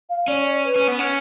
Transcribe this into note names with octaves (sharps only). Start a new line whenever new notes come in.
F5
C#4 D5
D5
B4
C#4
B3
C#4